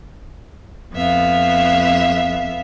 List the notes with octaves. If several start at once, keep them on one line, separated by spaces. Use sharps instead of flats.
F2 B3 E5 F5